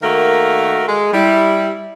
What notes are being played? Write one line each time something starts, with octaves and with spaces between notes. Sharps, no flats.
D#3 A3 A#3 F#4 A#4
G#3
G3 E4